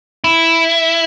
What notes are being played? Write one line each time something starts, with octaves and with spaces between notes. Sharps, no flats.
E4